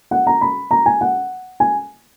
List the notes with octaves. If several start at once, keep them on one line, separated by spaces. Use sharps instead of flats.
F#5
A#5
B5
A#5
G#5
F#5
G#5